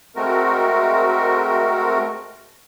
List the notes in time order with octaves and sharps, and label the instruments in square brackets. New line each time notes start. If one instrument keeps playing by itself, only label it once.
[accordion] G#3 A3 C4 F#4 A#4